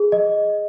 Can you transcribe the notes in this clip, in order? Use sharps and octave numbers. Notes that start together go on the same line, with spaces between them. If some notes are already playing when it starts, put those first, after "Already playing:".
Already playing: G#4
D#5